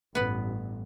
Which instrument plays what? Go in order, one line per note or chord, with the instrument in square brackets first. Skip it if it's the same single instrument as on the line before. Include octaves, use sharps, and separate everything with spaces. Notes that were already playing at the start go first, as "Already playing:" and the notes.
[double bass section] A1 G2 [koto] B3 B4